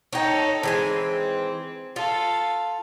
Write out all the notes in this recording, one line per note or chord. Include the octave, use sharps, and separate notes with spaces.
D#4 A4 C#5 G5
E3 G#3 C4 G#5
F4 A4 F5